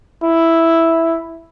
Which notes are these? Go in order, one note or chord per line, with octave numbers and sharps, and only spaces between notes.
E4